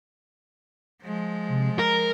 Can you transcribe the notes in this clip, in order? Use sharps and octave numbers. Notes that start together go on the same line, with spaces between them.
F3 G#3
C3
A#4 A#5